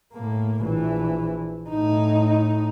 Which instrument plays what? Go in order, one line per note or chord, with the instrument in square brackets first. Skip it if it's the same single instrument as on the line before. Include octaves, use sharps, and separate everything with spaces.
[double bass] A2 A#3
A#1 E3
A2 D#4